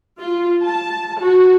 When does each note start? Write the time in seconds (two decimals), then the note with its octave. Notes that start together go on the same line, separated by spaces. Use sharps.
0.19 F4
0.64 A5
1.20 F#4